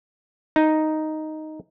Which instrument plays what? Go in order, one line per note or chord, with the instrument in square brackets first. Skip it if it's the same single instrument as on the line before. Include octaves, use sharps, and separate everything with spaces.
[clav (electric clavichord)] D#4